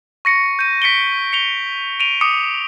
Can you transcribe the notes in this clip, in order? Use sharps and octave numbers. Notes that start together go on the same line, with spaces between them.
C#6 A#6 C#7
G6 D#7
A#6 B6 C#7 D7 G7
C#7 F7 G7
D7 D#7 F7
D6 D#6 C#7